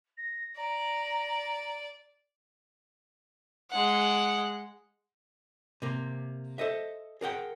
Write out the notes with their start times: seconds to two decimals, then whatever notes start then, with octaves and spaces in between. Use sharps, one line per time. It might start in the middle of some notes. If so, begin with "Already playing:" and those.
0.17 A#6
0.57 D5 A#5
3.70 G#3 F#5
5.82 C3 A#3
6.58 A4 C5 D#5 E5
7.21 G#4 A#4 F#5 G5